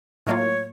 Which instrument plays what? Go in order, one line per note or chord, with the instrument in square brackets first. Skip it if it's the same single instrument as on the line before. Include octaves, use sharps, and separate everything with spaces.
[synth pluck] A2 F#3 A#3 F4 [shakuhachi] C#5 D#5